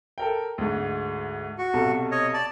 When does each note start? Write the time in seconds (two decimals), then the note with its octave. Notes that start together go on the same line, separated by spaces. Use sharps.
0.18 A4 A#4 G5
0.58 D2 G#2
1.58 F#4
1.73 B1 C3 A4
2.12 C#5 D#5
2.34 D5 A5